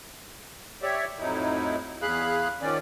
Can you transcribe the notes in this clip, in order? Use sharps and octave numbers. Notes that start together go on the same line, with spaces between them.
G4 C#5 D5 E5
F2 A2 F#3 D#4 E4
E2 G#4 F5 B5 F#6
D#3 F3 C#4 D5